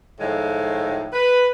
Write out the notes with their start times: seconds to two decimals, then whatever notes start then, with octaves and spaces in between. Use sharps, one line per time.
0.20 A2 D#3 F3 G#3 A3
1.13 B4